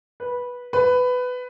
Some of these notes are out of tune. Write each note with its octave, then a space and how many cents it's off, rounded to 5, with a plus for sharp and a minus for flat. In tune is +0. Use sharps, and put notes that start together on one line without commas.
B4 -10
B4 +15